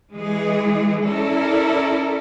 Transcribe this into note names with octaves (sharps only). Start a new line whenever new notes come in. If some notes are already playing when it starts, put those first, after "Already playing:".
E3 G#3 G#4
C#4 E4 A4 A#4 D5